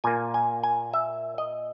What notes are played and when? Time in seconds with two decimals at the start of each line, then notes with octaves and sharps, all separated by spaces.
0.04 A#2 A#3 G#5
0.34 G#5
0.63 G#5
0.94 E5
1.38 D#5